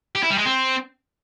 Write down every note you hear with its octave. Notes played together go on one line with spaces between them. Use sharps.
G4
E4
G3
G#3
C4